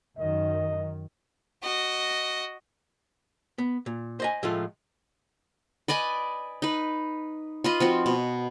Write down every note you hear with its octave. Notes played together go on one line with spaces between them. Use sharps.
F#2 D#3 D#5
F#4 D#5
B3
A#2
C5 D#5 G#5
A2 F3 G#3 A3 F4
B4 D5 D#5 G#5
D#4 B4
F4 B4 D#5
F3 C4 F#4
B2